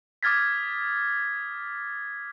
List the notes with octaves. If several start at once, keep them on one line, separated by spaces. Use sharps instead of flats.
D6 D#6 F6 G#6 A6 B6